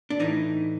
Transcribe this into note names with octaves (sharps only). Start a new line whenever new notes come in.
D4
A2 E3 D#4